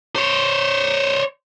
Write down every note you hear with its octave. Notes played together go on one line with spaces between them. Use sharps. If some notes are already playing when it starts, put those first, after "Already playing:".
C5 C#5